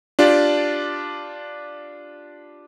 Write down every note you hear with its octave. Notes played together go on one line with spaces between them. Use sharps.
D4 F4 G4 D5